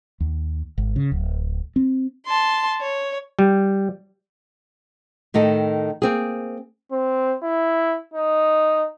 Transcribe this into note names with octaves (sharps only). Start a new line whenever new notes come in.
D#2
G#1
C#3
D1
C4
A5 C6
C#5
G3
A2 D#3 D#4 A4
A#3 C4 G#4
C4
E4
D#4